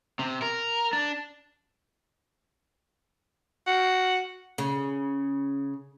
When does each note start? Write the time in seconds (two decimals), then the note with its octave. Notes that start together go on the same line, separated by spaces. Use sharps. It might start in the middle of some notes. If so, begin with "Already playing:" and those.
0.19 C3
0.42 A#4
0.93 D4
3.67 F#4
4.58 C#3